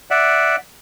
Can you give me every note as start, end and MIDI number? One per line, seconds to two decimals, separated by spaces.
0.11 0.56 74
0.11 0.56 76
0.11 0.56 78